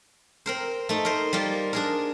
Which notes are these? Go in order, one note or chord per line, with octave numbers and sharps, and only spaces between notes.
C4 A#4 C5
A3 D#4
A#4 C5
G3 A#3 F4
D4 G#4 A#4